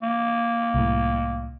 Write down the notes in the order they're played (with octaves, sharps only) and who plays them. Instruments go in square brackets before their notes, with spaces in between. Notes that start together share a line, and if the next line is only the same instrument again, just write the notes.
[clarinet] A#3
[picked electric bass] C2 A2